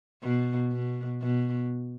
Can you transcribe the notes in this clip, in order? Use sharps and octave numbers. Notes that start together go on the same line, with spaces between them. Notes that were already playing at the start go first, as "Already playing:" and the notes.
B2
B2
B2